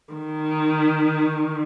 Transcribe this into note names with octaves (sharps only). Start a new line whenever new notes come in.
D#3